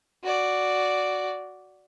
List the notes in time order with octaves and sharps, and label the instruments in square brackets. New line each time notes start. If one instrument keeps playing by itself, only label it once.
[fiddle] F#4 D5